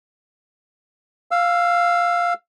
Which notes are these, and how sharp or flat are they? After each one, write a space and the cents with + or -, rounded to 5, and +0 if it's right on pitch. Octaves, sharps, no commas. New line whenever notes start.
F5 +0 E6 +20